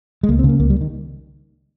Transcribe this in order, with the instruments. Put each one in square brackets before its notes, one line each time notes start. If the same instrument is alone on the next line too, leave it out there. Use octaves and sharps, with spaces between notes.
[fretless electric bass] G#3
C#2 A#3
C4
C#3
A#3
C#2 A#3
G3
D#3